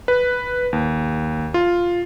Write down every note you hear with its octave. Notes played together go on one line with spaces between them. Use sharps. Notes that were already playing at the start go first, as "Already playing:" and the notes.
B4
D#2
F4